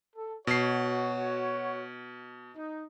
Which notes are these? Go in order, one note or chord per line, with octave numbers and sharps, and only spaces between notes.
A4
B2 F#4 C#5 C7
D#4